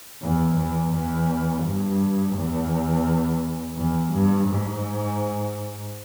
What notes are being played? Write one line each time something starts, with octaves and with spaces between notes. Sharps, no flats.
E2
E2
E2
G2
E2
E2
G2
G#2